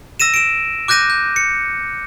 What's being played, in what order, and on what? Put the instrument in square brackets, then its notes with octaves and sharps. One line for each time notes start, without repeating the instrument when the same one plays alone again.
[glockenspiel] E6 A#6 D#7 E7
D7 E7
D6 F#6 G6 A#6 D#7
G6
C#7